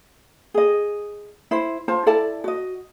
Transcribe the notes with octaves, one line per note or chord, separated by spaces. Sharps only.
G#4 D#5
E4 C5
F4 C5 A5
E4 A4 D5 A5
F#4 D#5